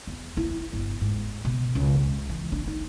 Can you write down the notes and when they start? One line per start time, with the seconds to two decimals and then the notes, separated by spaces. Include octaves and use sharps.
0.07 E2
0.37 E4
0.73 G1
1.01 G#2
1.45 B2
1.75 C#2
1.95 G#3
2.29 E3
2.52 D4
2.67 D#4